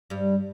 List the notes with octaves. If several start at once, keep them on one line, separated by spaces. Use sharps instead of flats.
G2 G3